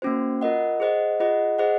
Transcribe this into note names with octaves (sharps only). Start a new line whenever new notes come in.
A#3 C#4 F#4 C5
F4 A#4 D#5 F#5
G#4 C5 D#5 F#5
F4 G#4 D#5 F#5
G#4 C5 D#5 F#5